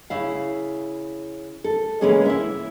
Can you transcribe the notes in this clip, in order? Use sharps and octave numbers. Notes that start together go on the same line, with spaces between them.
C#3 E4 F5
A4
C#3 E3 G#3 A#3 C#4 G#4
E4 E5